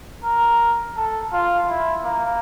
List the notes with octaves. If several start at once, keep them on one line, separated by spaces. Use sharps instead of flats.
A#4
A4
F4
E4
A#3